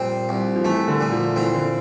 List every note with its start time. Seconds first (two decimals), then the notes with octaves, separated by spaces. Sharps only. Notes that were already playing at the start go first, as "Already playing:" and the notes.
Already playing: A#2 F3 G3 C4
0.29 C2
0.56 F3
0.65 E3 A3
0.88 D3
1.01 A#2
1.12 F3
1.36 E3 C4
1.54 D3